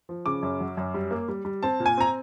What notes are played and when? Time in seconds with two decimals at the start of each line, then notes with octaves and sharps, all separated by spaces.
0.09 F3
0.26 C#3 D6
0.43 F#2
0.60 F#3
0.77 F#2
0.94 G3
1.11 A#3
1.28 G3
1.45 G3
1.63 C4 A5
1.80 A#2
1.86 G#5
1.97 C4 A#5